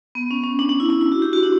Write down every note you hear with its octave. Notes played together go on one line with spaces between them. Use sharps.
B3
C#4
C#4
D4
D4
E4
D4
E4
F#4
G4
F#4
D4